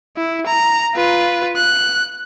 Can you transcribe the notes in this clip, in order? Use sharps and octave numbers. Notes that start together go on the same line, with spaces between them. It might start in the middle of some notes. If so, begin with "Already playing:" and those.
E4
A#5
F4 B4
F#6